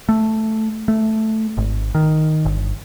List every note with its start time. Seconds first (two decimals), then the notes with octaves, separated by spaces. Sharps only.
0.09 A3
0.88 A3
1.57 G#1
1.95 D#3
2.45 G1